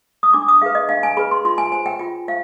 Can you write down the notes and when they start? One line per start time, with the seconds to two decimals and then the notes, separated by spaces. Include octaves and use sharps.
0.23 D#6
0.33 D4 D6
0.48 D#6
0.62 G#4 B4 F5
0.75 D#5
0.89 D4 F5
1.03 G#5
1.17 G#4 B4 B5
1.31 C6
1.45 F4 C6
1.58 G#5
1.72 C5 G#5
1.86 G5
1.99 F4 G5
2.28 C5 F5